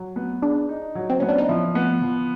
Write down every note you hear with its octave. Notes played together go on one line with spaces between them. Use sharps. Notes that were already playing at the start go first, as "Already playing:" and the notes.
Already playing: F#3
B3
D4 G#4
D#4
F#3
C4
B3 C#4
D4
D#4
F3 E4
B3
F3